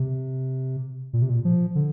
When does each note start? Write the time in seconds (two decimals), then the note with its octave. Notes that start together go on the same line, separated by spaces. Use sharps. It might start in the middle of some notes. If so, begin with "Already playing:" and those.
Already playing: C3
1.13 A#2
1.22 C3
1.29 A#2
1.45 F3
1.75 D3